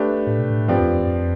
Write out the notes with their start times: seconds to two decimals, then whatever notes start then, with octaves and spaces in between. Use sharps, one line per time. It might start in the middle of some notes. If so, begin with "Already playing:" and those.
Already playing: A3 D4 G4 B4
0.27 A2
0.39 B2
0.50 A2
0.68 G2 F3 C4 G4 B4 D5
0.79 E2
0.89 F2
1.00 F2